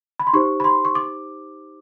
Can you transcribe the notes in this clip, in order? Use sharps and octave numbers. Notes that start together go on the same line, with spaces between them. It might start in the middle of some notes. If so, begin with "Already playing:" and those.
B5
C6
D#4 G4 C5 C#6
B5
C6
C#6
D6